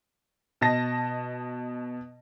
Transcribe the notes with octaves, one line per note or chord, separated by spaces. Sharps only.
B2 D#5 A5 A#6